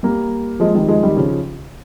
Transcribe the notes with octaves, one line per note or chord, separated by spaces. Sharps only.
G3 A#3
F3 G#3
D#3 G3
F3 G#3
D#3 G3
C#3 F3